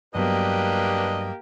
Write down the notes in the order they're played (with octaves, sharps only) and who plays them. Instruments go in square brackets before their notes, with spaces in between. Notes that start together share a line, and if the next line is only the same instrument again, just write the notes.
[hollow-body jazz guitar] G2 F#3 B3 [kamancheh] A#3 G4 [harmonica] D4 B4 D#5